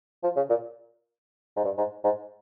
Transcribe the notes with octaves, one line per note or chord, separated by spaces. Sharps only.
F3
C#3
A#2
G#2
G2
G#2
G#2